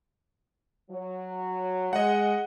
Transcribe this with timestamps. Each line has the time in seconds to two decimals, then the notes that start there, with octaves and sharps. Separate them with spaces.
0.90 F#3
1.93 G#3 D#5 F#5